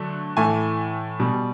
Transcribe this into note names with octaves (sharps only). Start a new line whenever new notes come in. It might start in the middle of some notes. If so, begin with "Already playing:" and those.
Already playing: D3 F#3 A3
A2 E3 A3 G#5
B2 G3